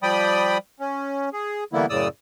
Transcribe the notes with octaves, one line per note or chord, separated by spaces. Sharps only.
F3 G3 D5 G5 B5 D#6
C#4
G#4
D3 E3 G3 A#3 B3 E4
F#2 A2 C#3 D5 D#6 E6